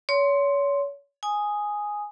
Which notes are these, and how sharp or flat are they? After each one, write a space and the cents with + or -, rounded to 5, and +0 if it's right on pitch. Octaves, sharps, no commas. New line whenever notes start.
C#5 +30 C6 +0
G#5 +0 D#6 +0